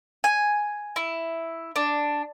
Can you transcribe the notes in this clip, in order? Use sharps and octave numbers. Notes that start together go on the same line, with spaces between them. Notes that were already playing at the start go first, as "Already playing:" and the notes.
G#5
E4
D4